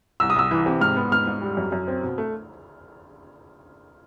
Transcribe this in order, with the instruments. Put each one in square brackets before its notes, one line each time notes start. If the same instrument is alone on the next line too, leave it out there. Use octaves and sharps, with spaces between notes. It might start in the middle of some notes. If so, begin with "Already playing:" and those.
[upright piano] C2 [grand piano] E6
[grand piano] D#6
[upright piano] C2 [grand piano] E6
[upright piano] E3
C3
[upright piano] G#2 [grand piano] F6
[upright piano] B3
[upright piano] G#2 [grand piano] F6
[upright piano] G#2
G3
F#2
F#2
C4
B2
A3